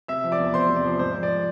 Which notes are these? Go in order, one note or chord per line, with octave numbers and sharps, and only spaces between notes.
C3 E5 E6
F3
D5 D6
E2
E2 C5 C6
C3
D5
F3
G#2 C5
F3
D5